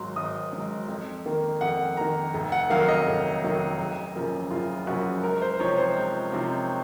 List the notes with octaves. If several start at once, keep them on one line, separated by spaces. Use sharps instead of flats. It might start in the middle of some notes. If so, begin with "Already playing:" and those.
Already playing: G#1 G#2 F#3 C6
G#1 D#6
G#2 F#3
F2
D#3 A#3
F2 F#5
D#3 A#3 A#5
F1
F#5
F2 D#3 F#3 A#3 F5
D#5
F1
F2 D#3 F#3 A#3
F#1
F#2 C#3 F3 A#3
F#1 F4
F#2 C#3 F3 A#3 F#4
C#2 A#4
C5
C3 F3 C4 D#4 C#5
C5
C#2
C3 F3 C4 D#4